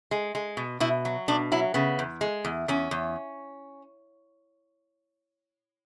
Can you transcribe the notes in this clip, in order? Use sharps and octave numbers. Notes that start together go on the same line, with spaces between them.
G#3
G#3
B2
B2 E4
F#3
B2 D4
F#3 E4
C#3 B3
E2
G#3
E2
E2 C#4
E2